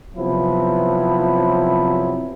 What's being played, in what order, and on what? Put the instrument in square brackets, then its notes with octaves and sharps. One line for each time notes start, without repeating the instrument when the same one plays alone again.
[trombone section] C3 F3 F#3 B3 C4 E4